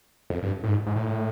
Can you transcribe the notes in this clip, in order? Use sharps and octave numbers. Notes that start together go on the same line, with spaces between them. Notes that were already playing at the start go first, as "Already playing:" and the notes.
F2
G2
A2
G#2
G#2
A2